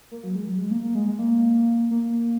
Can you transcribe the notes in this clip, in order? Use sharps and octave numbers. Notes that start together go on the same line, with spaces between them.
A#3
F#3
G#3
F#3
G#3
A#3
A#3
G#3
G#3
A#3
A#3